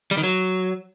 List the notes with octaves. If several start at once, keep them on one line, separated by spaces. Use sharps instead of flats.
G3
D#3
F#3